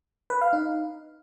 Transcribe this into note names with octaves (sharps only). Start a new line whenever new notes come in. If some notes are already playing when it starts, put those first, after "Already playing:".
B4
F5
D#4